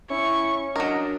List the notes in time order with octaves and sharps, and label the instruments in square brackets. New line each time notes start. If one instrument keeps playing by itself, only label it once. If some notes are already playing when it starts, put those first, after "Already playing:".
[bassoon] C#4 [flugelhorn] E4 [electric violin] C#6
[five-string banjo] F#3 A#4 [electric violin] D4 [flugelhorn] D#5